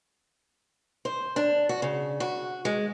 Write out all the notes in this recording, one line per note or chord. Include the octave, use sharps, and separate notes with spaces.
C5
D4
F#4
C#3
F#4
G#3